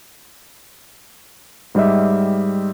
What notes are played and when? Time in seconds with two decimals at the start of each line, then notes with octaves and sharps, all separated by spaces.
1.75 G#2 G3 G4 D#5 E5